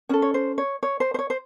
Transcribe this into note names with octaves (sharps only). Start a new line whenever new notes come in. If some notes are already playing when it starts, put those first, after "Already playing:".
C#4 A4 C#5
C#5
C5
C#5
C#5
C5
C5
C#5
C5